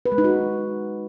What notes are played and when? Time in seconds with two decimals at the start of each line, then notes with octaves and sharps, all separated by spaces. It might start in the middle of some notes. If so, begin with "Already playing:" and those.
0.06 B4
0.12 G#3
0.18 D#4
0.24 F#4